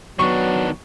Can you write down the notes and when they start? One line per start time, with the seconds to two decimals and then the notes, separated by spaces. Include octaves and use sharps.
0.19 D#3 F#3 B3 D4 C#6